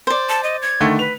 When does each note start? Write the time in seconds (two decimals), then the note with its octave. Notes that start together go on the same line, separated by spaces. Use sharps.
0.07 C5 D5
0.29 A5
0.44 D#5
0.62 G#6
0.80 D3 D#3 A3
0.99 B4 F7